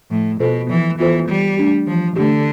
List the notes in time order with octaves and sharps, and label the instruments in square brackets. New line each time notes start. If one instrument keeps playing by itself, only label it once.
[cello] A2 [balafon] F3
[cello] B2 [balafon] B3 F4 A4 C5
[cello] E3 [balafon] F3
[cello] E3 [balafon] B3 F4 A4 C5
[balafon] E3 [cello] G3
[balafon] A3 D4 G4
[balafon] E3 [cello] F3
[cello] D3 [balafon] A3 D4 G4